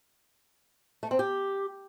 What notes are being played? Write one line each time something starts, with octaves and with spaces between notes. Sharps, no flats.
A3
C4
G4